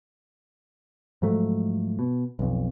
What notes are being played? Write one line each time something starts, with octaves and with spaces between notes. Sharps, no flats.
G#2 F3 F#3 A3
B2
B1 F2